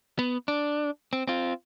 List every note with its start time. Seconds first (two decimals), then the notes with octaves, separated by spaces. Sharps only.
0.19 B3
0.48 D4
1.13 C4
1.28 C4 F4